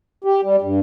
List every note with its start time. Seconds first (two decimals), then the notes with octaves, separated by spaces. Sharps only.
0.24 G4
0.43 G3
0.62 G2